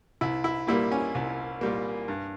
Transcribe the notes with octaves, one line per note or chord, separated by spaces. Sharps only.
C2 E4
E4
A#2 G3 A#3 E4
C#4
C2
A#2 G3 A#3
G2